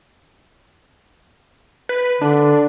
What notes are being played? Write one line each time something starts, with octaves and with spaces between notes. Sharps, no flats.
B4
D3 D4